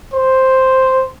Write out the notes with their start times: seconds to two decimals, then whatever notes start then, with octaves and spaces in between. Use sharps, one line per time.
0.13 C5